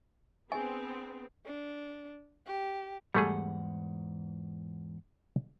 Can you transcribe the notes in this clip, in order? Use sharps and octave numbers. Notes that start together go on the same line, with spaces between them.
B3 C4 D4 G#4 G#5
D4
G4
E2 G#2 G3 A3 G#4 F#5